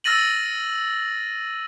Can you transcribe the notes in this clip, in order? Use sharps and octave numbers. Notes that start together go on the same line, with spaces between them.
E6 F6 A6 A#6 D#7 F#7